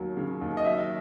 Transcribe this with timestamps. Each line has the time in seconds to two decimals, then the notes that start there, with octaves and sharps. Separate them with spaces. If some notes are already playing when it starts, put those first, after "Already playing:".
Already playing: D#2 F#3
0.17 C#3
0.42 D#2
0.57 D#5
0.64 F#3 E5